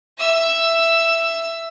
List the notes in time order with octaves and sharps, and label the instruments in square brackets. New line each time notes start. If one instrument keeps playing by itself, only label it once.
[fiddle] E5 E6